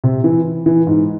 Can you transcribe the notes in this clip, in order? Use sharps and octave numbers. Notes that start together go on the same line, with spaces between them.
C3
E3
E3
G#2